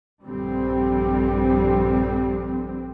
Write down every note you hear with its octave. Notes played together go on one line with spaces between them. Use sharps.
A#1 G2 D3 G3 C4